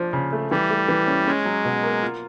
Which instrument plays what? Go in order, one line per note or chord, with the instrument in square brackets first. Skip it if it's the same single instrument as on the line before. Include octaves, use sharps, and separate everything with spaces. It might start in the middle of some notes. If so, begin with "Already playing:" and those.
Already playing: [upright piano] F3 D4
C#3
A3
[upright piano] E3 [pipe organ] G3
[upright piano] A3
E3
C#4
[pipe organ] G#3 [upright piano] C#4
[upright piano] F#3
B2
A#3
F4